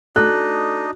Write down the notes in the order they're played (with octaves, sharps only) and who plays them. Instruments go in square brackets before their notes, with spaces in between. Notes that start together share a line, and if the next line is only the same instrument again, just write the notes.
[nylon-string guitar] A3 A4 [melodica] D4 D#4 D#5 [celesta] F#4 [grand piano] F#6